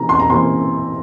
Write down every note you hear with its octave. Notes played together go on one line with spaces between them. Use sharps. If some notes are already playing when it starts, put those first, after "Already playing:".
Already playing: C3 E3 A#3 A#5
C6
A#5
C3 E3 A#3 C6